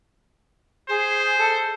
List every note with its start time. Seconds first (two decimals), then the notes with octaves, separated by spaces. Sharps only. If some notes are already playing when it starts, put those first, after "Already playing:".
0.89 G#4 C5
1.38 A4